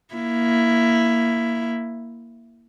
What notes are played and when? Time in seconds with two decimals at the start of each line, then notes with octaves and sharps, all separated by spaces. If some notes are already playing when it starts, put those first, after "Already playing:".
0.14 A#3 E4